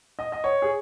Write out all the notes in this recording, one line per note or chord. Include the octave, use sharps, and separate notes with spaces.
D#5
D#5
C#5
G#4